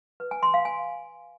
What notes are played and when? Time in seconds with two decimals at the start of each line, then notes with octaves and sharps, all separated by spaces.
0.20 B4
0.31 G#5
0.43 C6
0.54 F5
0.65 G#5